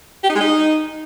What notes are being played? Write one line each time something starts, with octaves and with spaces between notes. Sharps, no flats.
G4
D#4
G#3
D#4